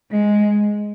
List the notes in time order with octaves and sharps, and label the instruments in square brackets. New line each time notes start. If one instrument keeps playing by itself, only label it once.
[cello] G#3